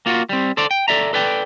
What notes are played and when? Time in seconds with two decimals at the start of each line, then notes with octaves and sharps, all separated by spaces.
0.06 A#3 F4 F#4
0.29 G3 C4
0.57 A4 C5 D5
0.71 G5
0.88 A4 D5 E5 A#5
1.13 A4 B4 D5 G5